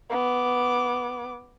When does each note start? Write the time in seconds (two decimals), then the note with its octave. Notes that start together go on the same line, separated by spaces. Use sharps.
0.10 B3 D6